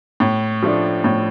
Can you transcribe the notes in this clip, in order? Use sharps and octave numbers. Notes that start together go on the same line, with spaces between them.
A2
F3 A3 D4
A2